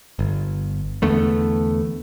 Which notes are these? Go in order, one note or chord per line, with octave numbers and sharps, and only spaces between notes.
G1
E2 D3 A3 B3